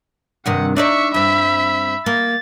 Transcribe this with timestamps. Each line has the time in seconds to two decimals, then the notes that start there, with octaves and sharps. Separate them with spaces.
0.46 G2 C3 D#3 F#5
0.76 D4 D#4 D5 E5 C#6
1.14 G2 C4 E5 B5
2.06 A#3 A6